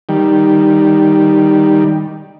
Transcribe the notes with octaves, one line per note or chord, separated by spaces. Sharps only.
D#3 G3